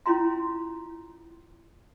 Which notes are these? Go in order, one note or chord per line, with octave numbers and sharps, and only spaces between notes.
C#4 E4 F4 A#5 C6